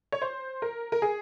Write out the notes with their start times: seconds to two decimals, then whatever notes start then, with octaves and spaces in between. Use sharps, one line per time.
0.12 C#5
0.22 C5
0.62 A#4
0.92 A#4
1.02 G#4